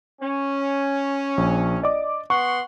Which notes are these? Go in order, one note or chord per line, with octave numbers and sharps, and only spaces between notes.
C#4
A#1
D5 D#5 D6
B3 F#5 C6 C#6